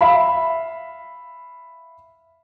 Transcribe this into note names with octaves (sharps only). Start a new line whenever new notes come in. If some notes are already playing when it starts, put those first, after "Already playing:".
E5 F5 B5